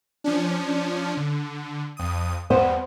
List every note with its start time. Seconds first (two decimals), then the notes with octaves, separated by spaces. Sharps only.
0.24 F3 C#4 D4
1.17 D3
1.97 F2 D#6
2.50 E2 G2 B3 C5